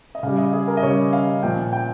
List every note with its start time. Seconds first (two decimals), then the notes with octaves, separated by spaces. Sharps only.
0.15 D#5
0.23 C#3 G3 F5
0.37 D#5
0.53 G#4
0.68 A#4
0.77 D#5
0.83 C#3 G3 C#5
1.13 F5
1.43 A#2 F3 G5
1.73 G5